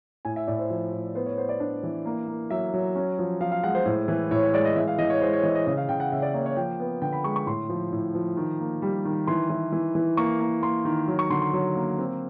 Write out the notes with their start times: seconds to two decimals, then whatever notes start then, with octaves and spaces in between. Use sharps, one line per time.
0.25 A2 G#5
0.36 E5
0.47 A2 D5
0.59 C5
0.70 F3
0.93 A2
1.15 B3 C5
1.26 C#5
1.38 B3 C5
1.49 D5
1.60 D4
1.83 E3
2.06 A#3
2.28 A#3
2.50 F#3 E5
2.74 F#3
2.95 C#4
3.19 F3
3.41 F3 F5
3.52 F5
3.63 G#3 F#5
3.75 C5
3.86 A2
4.08 E3
4.31 A2 C#5
4.43 C#5
4.53 G#3 D5
4.65 D#5
4.76 E3 E5
4.88 F5
4.98 E3 D#5
5.10 C#5
5.21 G#3 C5
5.33 C#5
5.43 E3 D#5
5.55 D#5
5.67 C#3 D#5
5.77 F5
5.89 C#3 G5
6.00 F#5
6.12 C#3 E5
6.22 D5
6.34 A#3 C#5
6.46 C#5
6.57 F3 G5
6.80 B3
7.02 D3 G5
7.13 B5
7.24 G#3 C#6
7.36 C#6
7.46 A2 C6
7.70 F3
7.92 A2
8.15 F3
8.37 D#3
8.60 A#3
8.82 G3
9.05 D#3
9.27 E3 C6
9.50 E3
9.72 E3
9.95 E3
10.17 A#3 C#6
10.40 A#3
10.63 A#3 C6
10.85 D#3
11.08 F#3
11.19 C#6
11.30 D3 C6
11.42 C6
11.53 F#3
11.76 A#3
11.98 C4